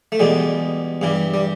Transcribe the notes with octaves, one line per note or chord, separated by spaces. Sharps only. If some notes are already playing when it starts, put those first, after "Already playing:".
A3
E2 B2 G3 G#3
G2 E3 G3
G3